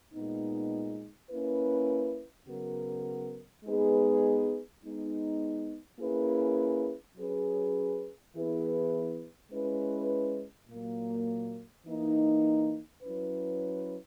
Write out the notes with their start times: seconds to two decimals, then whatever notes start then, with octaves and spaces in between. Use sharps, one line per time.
0.13 A#2 G#3 B3 D#4
1.30 A#3 C#4 E4 B4
2.47 C#3 F#3 B3 F#4 A#4
3.64 G#3 B3 D#4 G#4 B4
4.82 G#3 B3 D#4
5.99 A#3 C#4 E4 G#4 B4
7.16 F#3 C#4 G#4 B4
8.34 E3 B3 E4 G#4 B4
9.51 G#3 C#4 E4 B4
10.68 A#2 F#3 A#3
11.85 E3 A#3 D#4
13.02 F#3 C#4 E4 B4